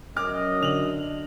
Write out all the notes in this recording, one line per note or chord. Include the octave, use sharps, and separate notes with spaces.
F#2 D#5 D6 F6
D3 F7 F#7